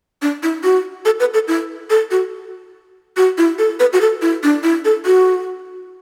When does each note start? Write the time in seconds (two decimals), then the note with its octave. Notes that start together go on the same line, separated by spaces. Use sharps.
0.22 D4
0.43 E4
0.64 F#4
1.05 A4
1.20 B4
1.34 A4
1.48 E4
1.90 A4
2.11 F#4
3.17 F#4
3.38 E4
3.59 A4
3.80 B4
3.93 F#4
4.01 A4
4.22 E4
4.43 D4
4.63 E4
4.85 A4
5.06 F#4